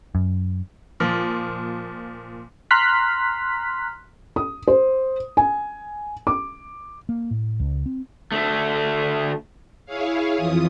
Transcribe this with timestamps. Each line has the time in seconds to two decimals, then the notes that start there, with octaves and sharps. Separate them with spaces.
0.15 F#2
1.00 A#2 F3 F4
2.71 A#5 C6 F6 F#6 B6
4.36 D#6
4.68 C5
5.37 G#5
6.27 D6
7.09 A#3
7.31 A2
7.60 C#2
7.86 C4
8.32 D2 A3
9.86 E4 G#4 C#5 F5
10.37 F2 E3 F4 D#6